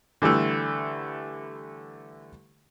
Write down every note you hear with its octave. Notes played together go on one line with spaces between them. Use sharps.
D3 E3 G3 A3